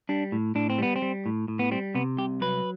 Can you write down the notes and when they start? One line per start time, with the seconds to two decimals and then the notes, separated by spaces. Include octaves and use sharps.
0.09 G3 D4
0.32 A2
0.55 A2 D4
0.70 C4
0.79 G3 B3
0.96 C4
1.02 G3
1.26 A2
1.48 A2
1.59 B3
1.71 G3 C4
1.95 C3 B3
2.17 C2 G4
2.41 F#3 B4